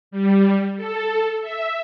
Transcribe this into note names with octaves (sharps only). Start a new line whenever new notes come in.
G3
A4
E5